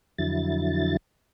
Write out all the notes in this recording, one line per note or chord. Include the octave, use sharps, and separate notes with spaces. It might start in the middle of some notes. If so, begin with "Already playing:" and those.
F2 D3 F#3 E4 A6